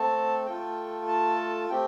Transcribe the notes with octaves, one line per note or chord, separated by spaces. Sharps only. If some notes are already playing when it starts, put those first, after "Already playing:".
Already playing: A3 C4 A4 A5
A3 F4 A4 G5
A5
A3 C4 G4 G5